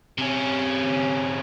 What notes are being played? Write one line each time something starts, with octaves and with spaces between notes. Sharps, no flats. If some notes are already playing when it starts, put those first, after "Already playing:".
C3 C#4